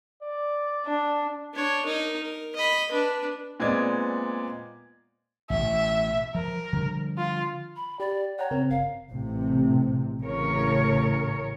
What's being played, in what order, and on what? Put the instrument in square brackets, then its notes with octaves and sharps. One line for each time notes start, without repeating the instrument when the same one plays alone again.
[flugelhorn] D5
[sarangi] D4
[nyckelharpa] D4 C#5
D#4 A#4
A#4
D#5 B5
D4 B4
[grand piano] A#2 G#3 B3 C4 D5 G#6
[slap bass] A1 B2 [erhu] E5
[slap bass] F3 [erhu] A#4
[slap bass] D3 F3 G3
[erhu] F4
[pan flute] B5
[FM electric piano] G4 [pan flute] D5
[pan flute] C#5 [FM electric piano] F#5 G5 A#5
[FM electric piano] C#3 C4 A#4
[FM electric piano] G1 [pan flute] F5
[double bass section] A1 C3
[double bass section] A1 [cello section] C#3 A#4 C#5